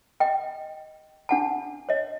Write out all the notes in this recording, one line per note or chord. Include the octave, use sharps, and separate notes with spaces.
D#5 G5
D4 F#5 A5
C#5 D#5